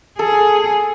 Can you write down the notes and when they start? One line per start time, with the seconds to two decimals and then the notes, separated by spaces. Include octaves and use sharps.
0.19 G#4 A4